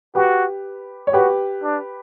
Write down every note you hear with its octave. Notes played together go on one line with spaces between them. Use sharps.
F#4 G4 B4
C#5
F#4 G4 B4
D4